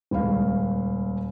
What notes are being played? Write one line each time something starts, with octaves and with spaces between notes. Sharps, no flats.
D#1 C#2 F5